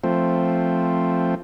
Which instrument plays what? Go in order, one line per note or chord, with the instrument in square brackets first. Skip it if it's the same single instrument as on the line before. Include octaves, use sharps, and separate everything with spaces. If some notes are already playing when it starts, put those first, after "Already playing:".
[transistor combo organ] F3 A3 C4